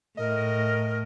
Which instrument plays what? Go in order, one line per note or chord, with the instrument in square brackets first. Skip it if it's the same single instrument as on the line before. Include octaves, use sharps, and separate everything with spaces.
[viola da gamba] A2 [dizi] A#4 [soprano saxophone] D#5